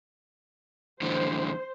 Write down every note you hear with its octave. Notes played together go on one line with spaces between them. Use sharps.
E2 A2 D3 C5